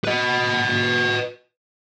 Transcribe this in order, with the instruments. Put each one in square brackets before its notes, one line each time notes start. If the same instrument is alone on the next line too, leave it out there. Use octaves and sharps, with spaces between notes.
[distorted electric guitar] B4 D#5